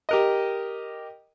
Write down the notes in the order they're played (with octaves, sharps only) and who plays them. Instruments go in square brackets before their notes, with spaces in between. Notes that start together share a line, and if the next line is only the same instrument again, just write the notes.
[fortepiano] G4 A#4 D#5